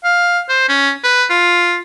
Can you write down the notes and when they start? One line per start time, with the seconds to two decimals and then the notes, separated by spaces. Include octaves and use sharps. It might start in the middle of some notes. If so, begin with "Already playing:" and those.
0.04 F5
0.49 C5
0.69 C#4
1.04 B4
1.30 F4